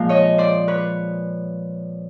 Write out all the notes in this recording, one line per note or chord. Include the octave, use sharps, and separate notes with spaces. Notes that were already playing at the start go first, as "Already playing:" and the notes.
Already playing: A#2 F3 G#3 F5
C#5 D#5
C5 D5
B4 C#5